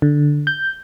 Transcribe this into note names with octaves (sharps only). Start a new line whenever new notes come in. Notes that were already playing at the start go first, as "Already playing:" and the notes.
D3
G6